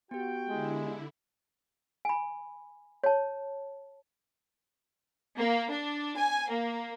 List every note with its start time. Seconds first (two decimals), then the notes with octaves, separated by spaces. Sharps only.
0.11 B3 F#4 G4 G5
0.49 D3 G#3 E4
2.05 G#5 B5
3.04 C#5 A5
5.38 A#3
5.71 D4
6.16 G#5
6.49 A#3